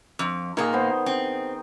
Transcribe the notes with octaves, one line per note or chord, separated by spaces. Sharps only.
F2
A#2 D#3 A#3 G#4
B3 C5
C4 G5